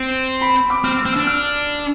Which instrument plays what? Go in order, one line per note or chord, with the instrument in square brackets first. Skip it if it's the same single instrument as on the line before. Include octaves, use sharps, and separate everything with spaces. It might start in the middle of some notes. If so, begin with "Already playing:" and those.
Already playing: [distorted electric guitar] C4
[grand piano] B5
D6
[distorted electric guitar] C4 [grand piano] F6
[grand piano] E6
[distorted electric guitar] C4
[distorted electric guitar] D4 [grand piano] E6
[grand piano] F6